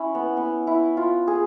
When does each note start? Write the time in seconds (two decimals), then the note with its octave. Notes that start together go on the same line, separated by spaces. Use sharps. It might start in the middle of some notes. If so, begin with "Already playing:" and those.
Already playing: C#4 E4
0.15 B3
0.37 B3
0.67 E4
0.97 F4
1.27 G#4